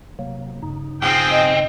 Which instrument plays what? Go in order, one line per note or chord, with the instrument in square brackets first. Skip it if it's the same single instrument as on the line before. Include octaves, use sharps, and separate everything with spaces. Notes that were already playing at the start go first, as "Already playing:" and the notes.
[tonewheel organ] C3 F#3 A#3
G2 C#3 D#4
[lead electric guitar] B1 C4 [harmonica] F3 G#4 G5
[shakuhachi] D#5